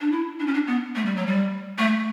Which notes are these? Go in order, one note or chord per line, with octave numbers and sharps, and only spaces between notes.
D4
E4
D4
C#4
D4
B3
A3
G3
F#3
G3
A3